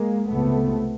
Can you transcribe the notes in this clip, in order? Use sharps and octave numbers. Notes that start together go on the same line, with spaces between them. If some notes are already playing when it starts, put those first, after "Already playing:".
Already playing: G#3 A#3
C#2 C3 A3 B3